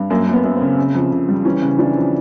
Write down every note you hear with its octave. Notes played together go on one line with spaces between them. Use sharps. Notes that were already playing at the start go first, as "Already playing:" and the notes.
Already playing: G2
F#2 A#3
F#2
B3
F#2
C4
C#3
C#3
F2
C#3
G3
E3 C#4
C#3
E3 D4
F2